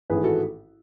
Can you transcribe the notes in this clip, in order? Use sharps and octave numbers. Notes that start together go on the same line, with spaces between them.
A1 G#2 D#3 A3 G#4 B4
F#4 A4